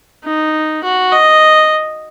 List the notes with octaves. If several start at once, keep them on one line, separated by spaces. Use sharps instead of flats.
D#4
F#4
D#5